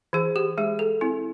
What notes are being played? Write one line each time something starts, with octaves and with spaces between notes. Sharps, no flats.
E3 G#4
G4
G#3 G#4
A4
C4 E4